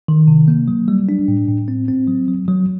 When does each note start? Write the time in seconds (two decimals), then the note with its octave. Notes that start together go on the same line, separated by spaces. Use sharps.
0.08 D#3
0.28 C3
0.48 A#3
0.68 F#3
0.88 G3
1.09 D4
1.28 A2
1.48 A2
1.68 C4
1.88 C4
2.08 F#3
2.28 F#3
2.48 F#3